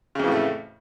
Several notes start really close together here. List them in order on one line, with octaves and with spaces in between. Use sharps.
C#3 F2 E3 A2 A3